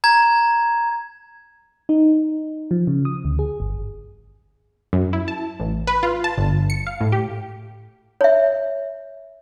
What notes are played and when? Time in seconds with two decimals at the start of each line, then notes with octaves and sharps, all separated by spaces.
0.04 A#5 G#6
1.89 D#4
2.71 F3
2.87 C#3
3.05 D#6
3.25 D2
3.39 G#4
3.60 G1
4.93 F#2
5.13 E4
5.28 A5
5.60 A1
5.87 B4
6.03 F4
6.24 A5
6.38 G1
6.70 C#7
6.87 F5
7.01 A2
7.12 G4
8.21 C#5 E5